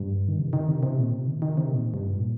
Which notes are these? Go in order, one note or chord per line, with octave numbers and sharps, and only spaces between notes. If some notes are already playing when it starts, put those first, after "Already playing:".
Already playing: G2
D#3
C3
D#3
C3
C3
A#2
C3
D#3
D#3
C3
A#2
G2
A#2